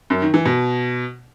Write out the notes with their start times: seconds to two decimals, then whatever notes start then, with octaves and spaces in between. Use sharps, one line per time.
0.10 F#2
0.22 D#3
0.34 E3
0.45 B2